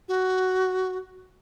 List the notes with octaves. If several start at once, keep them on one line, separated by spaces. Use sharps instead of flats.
F#4